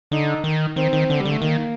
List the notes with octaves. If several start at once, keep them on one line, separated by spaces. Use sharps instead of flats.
D3 D#4
D#3
D#3 C4
D#3
D3
G3
D3
A3
D#3 A#3